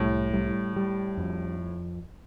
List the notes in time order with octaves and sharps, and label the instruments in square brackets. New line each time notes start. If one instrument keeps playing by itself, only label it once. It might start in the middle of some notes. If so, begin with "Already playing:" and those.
Already playing: [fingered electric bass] C2 G3 [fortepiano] A2
[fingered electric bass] G3
G3
F2